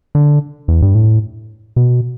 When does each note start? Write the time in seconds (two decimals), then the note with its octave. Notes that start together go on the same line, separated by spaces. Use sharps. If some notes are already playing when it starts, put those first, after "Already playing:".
0.15 D3
0.68 E2
0.82 G2
0.95 A2
1.76 B2